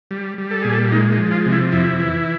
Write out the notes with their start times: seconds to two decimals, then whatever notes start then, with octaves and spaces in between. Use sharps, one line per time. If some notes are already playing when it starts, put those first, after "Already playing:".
0.11 G3
0.38 G3
0.51 A4
0.62 A#2 G#4
0.73 A4
0.92 G#3 D#4
1.12 D#4
1.18 F3
1.31 F4
1.46 C3
1.52 E4
1.72 F2 E4
2.00 E3